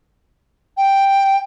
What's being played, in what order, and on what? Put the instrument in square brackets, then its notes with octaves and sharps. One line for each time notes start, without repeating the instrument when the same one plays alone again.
[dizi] G5